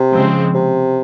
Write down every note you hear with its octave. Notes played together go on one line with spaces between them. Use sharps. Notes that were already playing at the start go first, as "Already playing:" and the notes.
Already playing: C3
C#3 F3 G#3 C4
C3